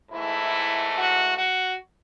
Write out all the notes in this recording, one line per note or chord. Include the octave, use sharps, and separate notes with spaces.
G#2 E3 A3 E4
F#4
F#4